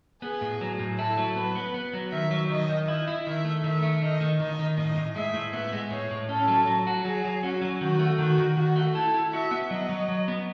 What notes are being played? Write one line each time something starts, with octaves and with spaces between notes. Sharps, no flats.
B3 G#4
A2
F#3
A2
E4 A4
F#3
B3 B4
B3
B3
F#3
D#3 E5
F#3
D#3 D#5
D#3
E4 D#5
E4
D#3 E5
A3
D#3 E5
A3
D#3 D#5
D#3
D#3 D#5
D#3
A2 D#5
A2
G#3 E5
A2
B3 E5
G#3
A2 C#5
A2
C#4 A4
F#3
F#3
F#4
F#3 G#4
F#3
C#4 F#4
F#3
D#3 F#4
A3
D#3 F#4
D#3
D#3 F#4
A3
E4 A4
E4
F#4 E5
B3
F#3 D#5
F#3
F#3
B3